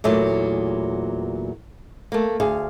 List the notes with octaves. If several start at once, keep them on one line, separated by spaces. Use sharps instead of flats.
E2 A#2 F#3 A3
A3 A#3
D2 G#4 F5